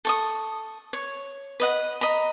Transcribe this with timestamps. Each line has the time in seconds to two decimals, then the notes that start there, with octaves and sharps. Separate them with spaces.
0.05 A4 C#6 D#6
0.93 C#5
1.60 B4 D#5 F#5
2.01 D#5 A#5 B5